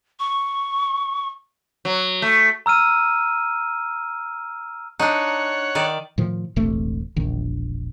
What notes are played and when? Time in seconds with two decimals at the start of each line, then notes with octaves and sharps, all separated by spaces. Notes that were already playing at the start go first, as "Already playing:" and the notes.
0.20 C#6
1.85 F#3
2.22 A3
2.66 A#5 E6 F6 D#7
4.99 D4 D#4 C#5 F#5
5.75 D#3 D5
6.18 A2 D#3 F3
6.56 E1 A#1 C3 A3
7.16 E1 A#1 D#3